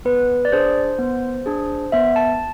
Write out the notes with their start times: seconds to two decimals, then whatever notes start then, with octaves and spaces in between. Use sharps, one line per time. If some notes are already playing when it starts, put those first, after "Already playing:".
0.05 B3 B4
0.45 D5
0.52 D4 G#4 C5
0.99 B3
1.46 D4 G#4
1.92 B3 E5
2.16 A5